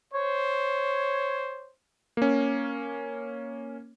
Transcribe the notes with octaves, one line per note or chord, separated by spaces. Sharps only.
C5 C#5
A#3 C#4